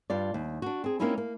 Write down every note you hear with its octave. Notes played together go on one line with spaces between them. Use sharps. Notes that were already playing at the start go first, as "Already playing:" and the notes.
G2 F4 D5
D#2
D4 F#4
C4 G#4
A#3 C4 C#4 D#4 E4 F#4
A#3